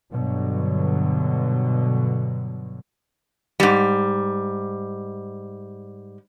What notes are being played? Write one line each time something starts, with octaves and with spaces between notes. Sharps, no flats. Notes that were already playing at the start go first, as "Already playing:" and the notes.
G2 B2 D3 F#3
G#2 G3